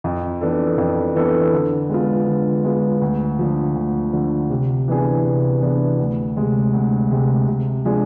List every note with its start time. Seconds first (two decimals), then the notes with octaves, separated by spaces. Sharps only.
0.04 F2
0.41 E3 B3 D4 A4
0.78 F2
1.16 E3 B3 D4 A4
1.53 D3
1.89 G#3 B3 F4
2.27 D3
2.64 G#3 B3 F4
3.01 D2
3.39 D3 F3
3.75 D2
4.13 D3 F3
4.50 C3
4.88 E3 B3 D4 G#4
5.25 C3
5.62 E3 B3 D4 G#4
5.99 D2
6.37 C3 G#3
6.73 D2
7.11 C3 G#3
7.48 C3
7.85 F3 G#3 D4 G#4